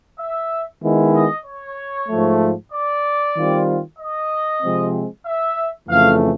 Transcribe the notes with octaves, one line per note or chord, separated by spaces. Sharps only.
E5
D#3 G#3 B3 E4
D#5
C#5
G#2 F3 A3
D5
D#3 G3 C4 F4
D#5
C3 F3 G#3 C4
E5
F2 C#3 E3 A3 F5